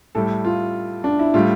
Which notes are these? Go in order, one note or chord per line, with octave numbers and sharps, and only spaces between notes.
A2 G3 A4
F4
D4
E4
A2 G3 F4